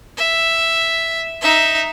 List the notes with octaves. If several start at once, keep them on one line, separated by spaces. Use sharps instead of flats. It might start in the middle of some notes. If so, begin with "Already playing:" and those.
E5
D#4 E5